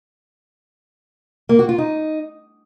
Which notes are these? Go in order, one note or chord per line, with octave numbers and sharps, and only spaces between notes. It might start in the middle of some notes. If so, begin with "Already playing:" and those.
A#3
F#4
F4
D#4